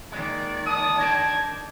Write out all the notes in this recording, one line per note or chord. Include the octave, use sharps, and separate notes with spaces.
A#2 D#3 G#3 D5
A5 D#6
D4 D#5 G5 G#6